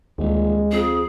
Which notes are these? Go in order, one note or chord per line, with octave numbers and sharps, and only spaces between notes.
D#1 D2 G#3
F2 G#4